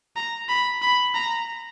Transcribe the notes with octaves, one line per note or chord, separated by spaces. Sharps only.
A#5
B5
B5
A#5